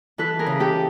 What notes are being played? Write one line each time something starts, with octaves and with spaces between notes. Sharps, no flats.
E3 A4 B4
G#4 A#4
C#3
G4 A4